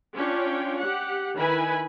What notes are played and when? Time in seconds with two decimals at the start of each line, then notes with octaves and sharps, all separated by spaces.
0.15 C#4 D4 F4 C#5 G5
0.79 G4 F#5
1.36 D#3 E4 B4 G#5 B5